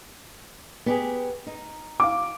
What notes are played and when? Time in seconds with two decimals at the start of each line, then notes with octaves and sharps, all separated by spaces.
0.86 B3 G4 G#4
1.47 D#4
2.00 F5 D6